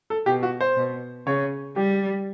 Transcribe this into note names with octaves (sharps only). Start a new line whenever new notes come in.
A4
B2 G4
F#4
C5
B2
C#3 C#5
G3 G4